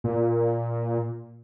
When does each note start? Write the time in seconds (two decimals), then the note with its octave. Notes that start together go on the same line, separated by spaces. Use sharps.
0.04 A#2